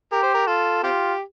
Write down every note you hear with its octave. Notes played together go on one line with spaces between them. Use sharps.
G4 A#4
C5
A#4
F4 A4
C4 F4 G4